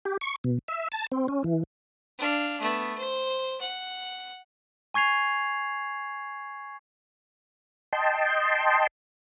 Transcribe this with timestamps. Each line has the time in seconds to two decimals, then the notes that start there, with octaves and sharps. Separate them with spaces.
0.05 G4
0.21 C#6
0.44 B2
0.68 E5
0.92 A5
1.12 C4
1.28 C#4
1.44 E3
2.18 D4 F5
2.61 A3 B3
2.98 C5
3.61 F#5
4.94 G#5 C#6 G#6 C7 F7
7.93 D#5 G5 A5 C6